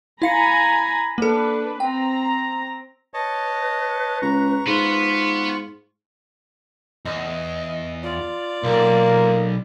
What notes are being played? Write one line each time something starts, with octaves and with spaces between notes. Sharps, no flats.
E4 F5 G#5 A#5 B5 C#7
A#3 D4 A4 B4
C4 G5 A#5
B4 C#5 D#5 A5
C#2 A#5 C#6
G#2 B3 F4 C#6
E2 D#5
F4 D5
B1 A#3